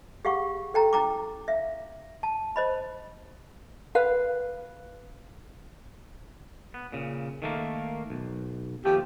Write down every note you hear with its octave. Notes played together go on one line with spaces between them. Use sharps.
G4 G#4 F5 F#5 C#6
A4 G5 A#5
C#4 E4 G5 A#5 D6
E5 F5
A5
C5 D#5 B5
B4 F5
B3
A#2 C#3
D#3 A3 A#3
B1
D#2 F3 A3 G4